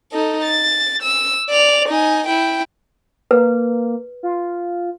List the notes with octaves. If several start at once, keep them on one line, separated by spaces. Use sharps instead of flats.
D#4 A4
A6
E6
D5 F7
D#4 G#5
E4 G5
A#3 B4
F4